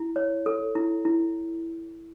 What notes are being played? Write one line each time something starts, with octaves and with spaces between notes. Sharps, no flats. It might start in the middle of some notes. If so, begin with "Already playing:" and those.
Already playing: E4
C#5
A4
E4
E4